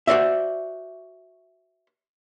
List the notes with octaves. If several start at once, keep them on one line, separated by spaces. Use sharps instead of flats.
F#4 C5 D5 E5